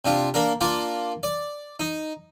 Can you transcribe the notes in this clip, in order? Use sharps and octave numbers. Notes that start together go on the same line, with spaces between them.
C3 D4 F4
A#3 D4 A#4
A#3 D4 F4 D5
D5
D#4